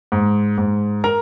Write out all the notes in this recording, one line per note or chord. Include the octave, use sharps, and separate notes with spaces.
G#2
G#2
A#4 A#5